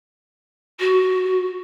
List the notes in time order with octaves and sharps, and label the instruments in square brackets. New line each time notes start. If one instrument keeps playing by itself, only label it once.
[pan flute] F#4